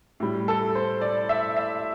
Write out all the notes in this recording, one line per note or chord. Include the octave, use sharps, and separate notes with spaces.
A2 G3
A4
C5
D5
E5
E5